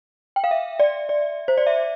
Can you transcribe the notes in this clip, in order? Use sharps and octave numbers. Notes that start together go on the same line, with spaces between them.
G5
F5
E5
D5
D5
C5
D5
E5